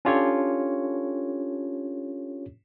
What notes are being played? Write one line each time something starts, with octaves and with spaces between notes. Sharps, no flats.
C#4 D4 F4 G4 A4 C#5